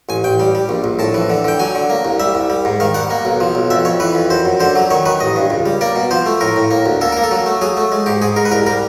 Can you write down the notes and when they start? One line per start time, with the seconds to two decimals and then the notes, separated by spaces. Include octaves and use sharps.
0.09 A1 G#5
0.24 A1 G5
0.40 G3
0.55 G3
0.69 A#1
0.84 A#1
0.99 A2 A5
1.14 E3
1.30 D3
1.44 D3 G5
1.59 F#3 G#5
1.75 D3
1.90 A#3
2.05 C2
2.20 G3 E5
2.35 C2
2.50 G3
2.65 G#2
2.80 D#3 F5
2.94 G3 F#5
3.10 A#3
3.25 B1
3.40 F3
3.55 B1
3.70 F2 E5
3.85 F2 C#5
4.00 E3 B4
4.15 F2
4.30 F#2 C5
4.45 F#2
4.60 D3 C5
4.75 F#3
4.91 D#3 C#5
5.06 D#3 B4
5.20 A1 D#5
5.36 G2
5.50 C#2
5.66 G3
5.81 A#3 D5
5.96 B2
6.11 F3 C5
6.26 A3
6.41 A2 A#4
6.56 A2
6.71 A#3
6.86 D2
7.01 A#3 A4
7.12 A#3 A#4
7.23 A4
7.31 F#3
7.46 A3
7.61 F#3 G#4
7.77 A3
7.92 G#3
8.06 G#2 G4
8.22 G#2 G#4
8.36 G#2 A#4
8.45 B4
8.51 C2 A#4
8.66 G3 A#4